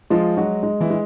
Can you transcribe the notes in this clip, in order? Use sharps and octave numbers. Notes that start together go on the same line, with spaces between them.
F3 G#3 F4
F#3 G#3 F#4
G#3
E3 E4
G#3